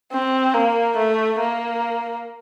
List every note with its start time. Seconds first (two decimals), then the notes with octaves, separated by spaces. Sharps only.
0.13 C4
0.54 A#3
0.97 A3
1.40 A#3